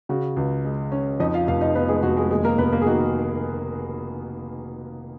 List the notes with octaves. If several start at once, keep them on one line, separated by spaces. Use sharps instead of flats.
C#3 F#4
C#2
G#3
C#4
F2 D#4 D#5
F4 F5
F1 F4 F5
D#4 D#5
F3 B3 B4
G#3 G#4
F1 F#4
G#3 G#4
D#2 G#3 G#4
A#3 A#4
F1 B3 B4
A#3 A#4
G#4
D#3 F#4